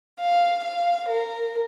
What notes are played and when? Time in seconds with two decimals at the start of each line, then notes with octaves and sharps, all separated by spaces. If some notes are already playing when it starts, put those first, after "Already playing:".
0.19 F5
0.63 F5
1.09 A#4